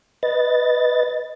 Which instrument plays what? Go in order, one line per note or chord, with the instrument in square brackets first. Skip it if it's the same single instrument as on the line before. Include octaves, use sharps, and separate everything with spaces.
[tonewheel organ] B4 D#5 A6